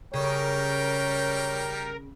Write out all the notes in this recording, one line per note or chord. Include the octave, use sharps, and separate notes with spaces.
C#3 G3 A#4 C#5 G5